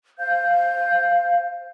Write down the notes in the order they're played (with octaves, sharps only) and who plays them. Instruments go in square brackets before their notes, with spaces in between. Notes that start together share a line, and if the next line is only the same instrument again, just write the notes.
[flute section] C5 F5 G6